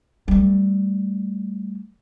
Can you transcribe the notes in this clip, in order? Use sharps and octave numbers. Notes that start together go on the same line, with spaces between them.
G3 A3